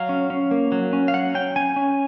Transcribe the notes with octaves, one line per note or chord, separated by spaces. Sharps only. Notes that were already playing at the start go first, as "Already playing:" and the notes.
Already playing: F#3 F5
C#4
C#4
A#3
F#3
C#4
F5
F#3 F#5
C#4 G5
C#4 G#5
C#4